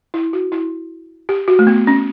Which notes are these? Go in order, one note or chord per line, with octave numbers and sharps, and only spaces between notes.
E4
F#4
E4
G4
F#4
A3
B3
C#4